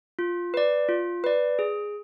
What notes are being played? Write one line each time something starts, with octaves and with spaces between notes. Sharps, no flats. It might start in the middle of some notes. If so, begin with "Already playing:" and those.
F4
B4 D5
F4
B4 D5
G#4